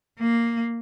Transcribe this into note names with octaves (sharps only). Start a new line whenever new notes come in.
A#3